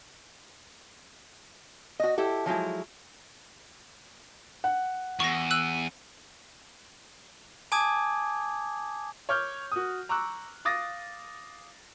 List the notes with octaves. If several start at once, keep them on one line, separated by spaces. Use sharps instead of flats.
F#4 D#5
E4 G4 A4
F3 F#3 G#3 E4
F#5
E2 C#6 A#6
E6 F#6 F#7
G#5 A5 D6 D#6 G#6
C#5 D6 F6 G6
F#4 D#6
A#5 C#6 D6 E6 F#6
F5 D6 D#6 A6 A#6